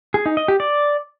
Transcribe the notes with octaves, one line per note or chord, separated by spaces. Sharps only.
G#4
D#4
D#5
G4
D5